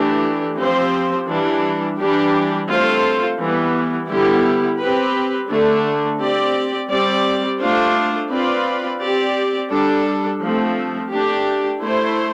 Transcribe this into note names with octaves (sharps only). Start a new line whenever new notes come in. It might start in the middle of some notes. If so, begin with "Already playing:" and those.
Already playing: E3 A3 D4 G4
F3 C4 G4 C5
E3 G3 D4
E3 G3 D4 G4
A3 C4 F4 A4 C5
E3 G3 B3
D3 G3 B3 E4 G4
C4 G4 B4
D3 A3 D4
C4 G4 D5
G3 C4 G4 D5
A3 D4 F4 C5
C4 F4 B4 D5
C4 G4 D5
G3 D4 A4
F3 A3 C4
A3 D4 G4
A3 E4 A4 C5